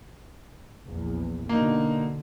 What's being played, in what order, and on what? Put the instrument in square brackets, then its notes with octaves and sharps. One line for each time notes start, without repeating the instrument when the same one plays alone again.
[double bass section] A#1 E2
[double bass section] B2 D3 [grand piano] A#3 D#4